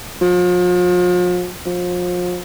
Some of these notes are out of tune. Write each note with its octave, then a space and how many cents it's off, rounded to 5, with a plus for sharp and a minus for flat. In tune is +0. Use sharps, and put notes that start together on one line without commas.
F3 +40
F3 +35